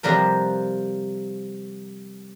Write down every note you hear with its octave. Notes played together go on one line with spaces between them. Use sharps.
C3 F3 G3 A#4 B4